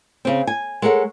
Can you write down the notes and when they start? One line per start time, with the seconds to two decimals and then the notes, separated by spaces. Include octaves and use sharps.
0.25 C#3 C4
0.47 G#5
0.82 G#3 A4 A#4 C#5 F#5